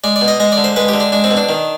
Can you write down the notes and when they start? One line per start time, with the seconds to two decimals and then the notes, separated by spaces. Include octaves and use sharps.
0.04 G#3 D5
0.16 D5
0.21 B2
0.28 D#5
0.40 G#3 D#5
0.52 D5
0.57 D3
0.64 C5
0.76 G#3 B4
0.88 G4
0.94 D3
1.00 D4
1.12 G#3 D4
1.24 C4
1.31 B2
1.37 D4
1.49 D#3